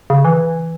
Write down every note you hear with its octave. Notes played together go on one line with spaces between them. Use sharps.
C#3
E3